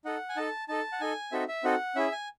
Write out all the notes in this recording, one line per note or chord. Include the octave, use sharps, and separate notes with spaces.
D#4 A4 F#5
G#5
D#4 A4 A5
D#4 A4 A5
F#5
D#4 A4 G#5
C4 D#4 F#4 A4 E5
E5
C4 D#4 F#4 A4 F#5
C#4 E4 G#4 E5
G#5